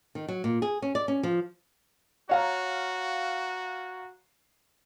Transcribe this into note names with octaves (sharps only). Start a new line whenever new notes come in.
D#3
F#3
A#2
G#4
C#4
D5
C#4
F3
F#4 C#5 F5 A#5